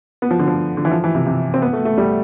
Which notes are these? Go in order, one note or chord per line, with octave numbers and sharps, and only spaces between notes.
B3
F3
D3
F3
D3
E3
F3
E3
C3
C3
C4
B3
A3
A3
G3